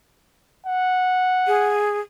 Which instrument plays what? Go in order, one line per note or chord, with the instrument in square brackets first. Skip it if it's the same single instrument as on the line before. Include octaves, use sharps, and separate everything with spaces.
[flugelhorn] F#5
[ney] G#4